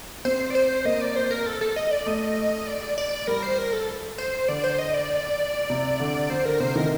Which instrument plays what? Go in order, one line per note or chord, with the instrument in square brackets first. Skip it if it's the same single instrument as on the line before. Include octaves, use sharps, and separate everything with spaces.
[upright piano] C4 [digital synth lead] C5
[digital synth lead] D5
C5
[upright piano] A#3 [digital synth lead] D#5
[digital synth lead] D5
C5
A#4
A4
A4
D#5
D5
[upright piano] A3 [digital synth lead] D#5
[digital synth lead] D5
D5
[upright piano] G3 [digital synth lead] A#4
[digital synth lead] C5
A#4
A4
C5
[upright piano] D3 [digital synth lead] D5
[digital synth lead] C5
D#5
D5
[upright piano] C3
D3
[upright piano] D3 [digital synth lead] C5
[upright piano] D3 [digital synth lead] A#4
[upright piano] C3 [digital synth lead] C5
[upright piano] D#3 [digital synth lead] A#4